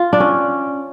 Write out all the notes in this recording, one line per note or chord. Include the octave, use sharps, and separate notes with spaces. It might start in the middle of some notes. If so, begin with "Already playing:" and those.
Already playing: F4
D4
C#4